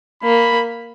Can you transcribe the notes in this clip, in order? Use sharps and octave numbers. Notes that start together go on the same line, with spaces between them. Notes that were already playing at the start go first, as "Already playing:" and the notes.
A#3 B5